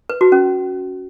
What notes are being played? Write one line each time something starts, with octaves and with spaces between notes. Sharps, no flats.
B4
F#4
C#4